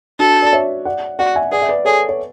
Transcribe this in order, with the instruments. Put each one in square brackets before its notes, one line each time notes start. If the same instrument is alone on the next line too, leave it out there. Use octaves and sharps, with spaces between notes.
[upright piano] D4 F#4 [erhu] A4
[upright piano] D5
C#5 E5
D5 F#5
[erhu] F#4 [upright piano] D5 F#5
[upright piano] E5 G#5
[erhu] G#4 [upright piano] D5 F#5
[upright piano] E5
B4 D5
[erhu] G#4 [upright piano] A4 C#5
[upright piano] C#5